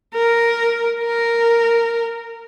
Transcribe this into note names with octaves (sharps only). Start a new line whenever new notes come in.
A#4
A#4